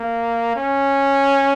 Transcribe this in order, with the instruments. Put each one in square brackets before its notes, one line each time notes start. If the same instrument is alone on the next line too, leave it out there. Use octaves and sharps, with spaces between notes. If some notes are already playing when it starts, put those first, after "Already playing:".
Already playing: [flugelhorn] A#3
C#4